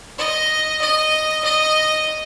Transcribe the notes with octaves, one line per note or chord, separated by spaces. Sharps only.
D#5
D#5
D#5